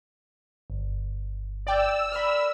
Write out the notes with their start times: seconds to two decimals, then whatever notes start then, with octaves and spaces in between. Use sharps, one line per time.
0.70 G1
1.67 D5 G5 E6
2.12 A#4 B4 D5 B5 F6